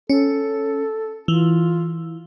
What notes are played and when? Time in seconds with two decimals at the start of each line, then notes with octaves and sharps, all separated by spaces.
0.10 C#4 A4
1.28 E3 F4